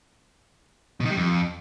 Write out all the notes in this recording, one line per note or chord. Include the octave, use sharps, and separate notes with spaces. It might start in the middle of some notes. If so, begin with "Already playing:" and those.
B2
D#3
G3
F2